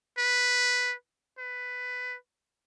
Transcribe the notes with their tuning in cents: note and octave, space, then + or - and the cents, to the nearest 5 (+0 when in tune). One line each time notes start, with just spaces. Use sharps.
B4 +0
B4 +10